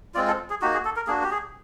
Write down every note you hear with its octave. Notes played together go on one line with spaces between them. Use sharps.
G#3 C4 F4 D5
A4
G#4
A#3 D#4 F#4 G4
G#4
A4
A#4
A#3 D4 F#4 G#4
G4
G#4